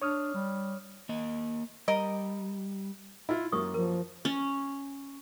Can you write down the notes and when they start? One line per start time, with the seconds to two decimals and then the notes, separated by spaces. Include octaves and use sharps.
0.02 D4 C#5 D#6 F6
0.34 G3
1.09 A#3 D#5
1.88 G3 A#4 D#5
3.29 E4 F4
3.52 F#2 A#3 G4 C#6 D#6
3.74 F3 A#4
4.25 C#4